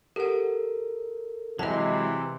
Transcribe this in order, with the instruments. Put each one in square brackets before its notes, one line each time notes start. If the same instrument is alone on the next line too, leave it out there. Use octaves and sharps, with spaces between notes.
[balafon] G4 F#5 [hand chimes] A4 A#4
[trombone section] C3 E3 [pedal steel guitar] F#3 G#3 E4 [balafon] D#5 A5